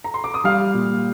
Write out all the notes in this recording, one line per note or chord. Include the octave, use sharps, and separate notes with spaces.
A#5
C6
D6
D#6
G3 F5 F6
A#2